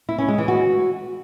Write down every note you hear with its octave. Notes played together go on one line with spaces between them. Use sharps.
E4
C#4
G#3
E3
F#4